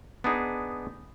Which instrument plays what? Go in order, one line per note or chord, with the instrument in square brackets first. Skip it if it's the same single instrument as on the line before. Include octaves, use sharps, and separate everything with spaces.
[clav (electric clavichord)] B3 D4 D#4 G#4